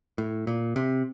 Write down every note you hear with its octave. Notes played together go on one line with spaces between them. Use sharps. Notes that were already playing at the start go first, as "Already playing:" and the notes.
A2
A#2
C3